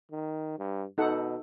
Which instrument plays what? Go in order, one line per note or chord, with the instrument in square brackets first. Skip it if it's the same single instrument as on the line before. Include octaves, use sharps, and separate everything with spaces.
[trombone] D#3
G2
[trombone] B2 [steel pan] D#4 A4 F#5